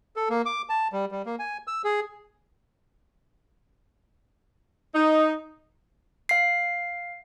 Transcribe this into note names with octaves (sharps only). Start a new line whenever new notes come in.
A4
A#3
D6
A5
G3
G3
A#3
G#5
E6
G#4
D#4
F5 C7